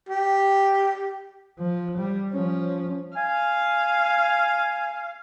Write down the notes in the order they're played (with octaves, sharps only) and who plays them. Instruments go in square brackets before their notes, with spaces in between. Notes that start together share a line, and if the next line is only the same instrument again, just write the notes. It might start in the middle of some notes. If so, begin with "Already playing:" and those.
[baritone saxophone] G4
[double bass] F3
G3
F3 C#4
[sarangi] F5 [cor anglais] G#5